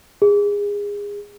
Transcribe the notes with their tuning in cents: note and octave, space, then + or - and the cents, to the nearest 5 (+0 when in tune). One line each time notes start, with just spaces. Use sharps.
G#4 -25